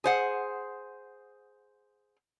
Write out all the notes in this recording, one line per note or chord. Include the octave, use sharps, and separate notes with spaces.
G#4 C5 F#5